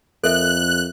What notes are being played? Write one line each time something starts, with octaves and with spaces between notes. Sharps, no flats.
F2 A4 A#4 E5 F#6